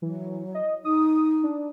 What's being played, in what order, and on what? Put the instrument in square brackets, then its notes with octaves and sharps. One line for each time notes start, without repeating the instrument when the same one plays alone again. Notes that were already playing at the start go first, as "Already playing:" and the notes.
[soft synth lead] E3 [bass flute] F#3
[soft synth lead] D#5
[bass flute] D#4 [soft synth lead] D#6
[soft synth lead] D4